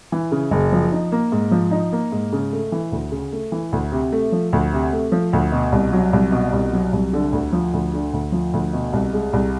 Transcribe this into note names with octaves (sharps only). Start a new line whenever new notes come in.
E3
C#3
F#1
F3
D#4
A#3
G#2
F3
D#4
A#3
G#2
C#3
A3
E3
D2
C#3
A3
E3
D2
C3
A3
F3
D2
C3
A3
F3
D2
B2
C2
F#3
C2
B2
C2
F#3
C2
D3
D2
F3
D2
D3
D2
F3
D2
B2
C2
G#3
C2